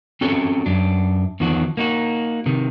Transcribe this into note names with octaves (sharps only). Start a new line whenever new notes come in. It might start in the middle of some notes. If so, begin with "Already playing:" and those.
C4 C#4 F#4 A4 C#5
F#2 D4
E2 D#3 F3 D4 F#4
A#3 D#4 F#4
C3 D#3